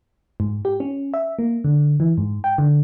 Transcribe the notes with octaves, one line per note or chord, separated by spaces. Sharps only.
G#2
G4
C#4
E5
A#3
D3
E3
G#2
G5
D3